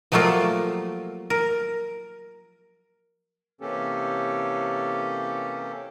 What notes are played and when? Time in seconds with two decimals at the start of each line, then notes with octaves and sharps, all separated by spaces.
0.12 F3 F#3 A3 A#3 F4 G4
1.30 A#4
3.61 C3 E3 A#3 C#4 G4 A4